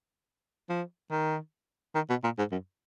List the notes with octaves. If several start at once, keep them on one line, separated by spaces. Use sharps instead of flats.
F3
D#3
D#3
B2
A#2
G#2
F#2